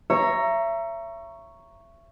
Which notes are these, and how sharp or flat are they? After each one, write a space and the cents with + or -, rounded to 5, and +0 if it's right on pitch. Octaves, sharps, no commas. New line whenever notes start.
C#5 +0 E5 +30 A#5 +0